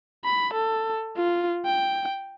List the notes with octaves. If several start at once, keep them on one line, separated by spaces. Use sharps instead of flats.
B5
A4
F4
G5